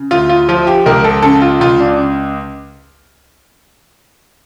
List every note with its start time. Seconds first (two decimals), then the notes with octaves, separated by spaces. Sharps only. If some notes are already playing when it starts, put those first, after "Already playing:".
Already playing: C#3
0.11 D2 F4
0.29 F4
0.49 F3 F4
0.67 G4
0.86 C#2 A#4
1.04 A4
1.23 C#3 A4
1.42 F4
1.61 C#2 F4
1.80 D4
1.97 C#3